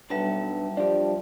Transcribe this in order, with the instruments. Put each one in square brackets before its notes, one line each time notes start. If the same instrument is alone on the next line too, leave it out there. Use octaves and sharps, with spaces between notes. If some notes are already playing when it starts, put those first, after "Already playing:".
[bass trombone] B1 [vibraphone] G3 E5 A5 [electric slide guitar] D4 B4 F#5
[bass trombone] F3 [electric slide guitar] D4 G4 [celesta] D5